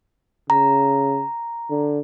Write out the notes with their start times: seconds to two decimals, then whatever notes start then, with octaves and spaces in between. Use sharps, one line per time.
0.50 C#3 A#5
1.70 D3